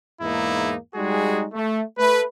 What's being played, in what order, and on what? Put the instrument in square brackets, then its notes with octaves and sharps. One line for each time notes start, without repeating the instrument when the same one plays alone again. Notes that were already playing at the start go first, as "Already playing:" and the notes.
[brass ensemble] E2 G#2 A#3 D#4 E4
G3 G#3 D#4 F#4 G#4
A3
A3 B4